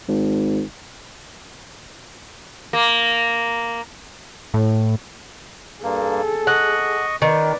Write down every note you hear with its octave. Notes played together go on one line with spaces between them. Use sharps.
G#1
A#3
A2
G2 A#3 G#4 A4
D#5 F#5 C#6
D#3 B4 D5